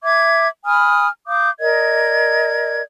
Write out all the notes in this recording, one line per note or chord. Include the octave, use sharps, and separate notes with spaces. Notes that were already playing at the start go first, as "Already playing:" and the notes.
E5 D6 G#6
G#5 B5 D#6 F6
F5 D6 D#6 G6
A#4 D5 D#5 G#6